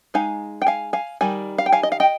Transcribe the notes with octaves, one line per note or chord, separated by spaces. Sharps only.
G#3 D#4 F5 G#5
G5
F5 G#5
F5 G#5
D#3 G3 G#5
F5
G5
F5 G#5
D#5
F5
D#5 G5